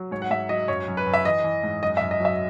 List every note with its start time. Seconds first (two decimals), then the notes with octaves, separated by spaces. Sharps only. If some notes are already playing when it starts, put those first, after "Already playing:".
Already playing: F#3
0.11 G#2 C#5
0.22 F#5
0.30 G#2 E5
0.49 F#3 D#5
0.68 F#2 C#5
0.88 F#2
0.97 B4
1.06 F#2
1.14 E5
1.25 E3 D#5
1.44 E3
1.64 G#2
1.82 F#2 D#5
1.97 E5
2.01 F#2
2.11 D#5
2.20 F#3 E5